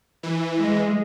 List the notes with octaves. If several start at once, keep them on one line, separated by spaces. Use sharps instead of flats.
E3
G#3